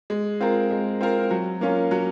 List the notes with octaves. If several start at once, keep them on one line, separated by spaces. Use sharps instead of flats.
G#3
C4 F4 A#4
G#3
C4 F4 A#4
F#3
A#3 C#4 F4
F#3